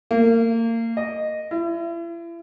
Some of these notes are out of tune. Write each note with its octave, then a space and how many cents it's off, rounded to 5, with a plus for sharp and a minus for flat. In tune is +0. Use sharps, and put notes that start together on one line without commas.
A#3 -30
D#5 -10
E4 +40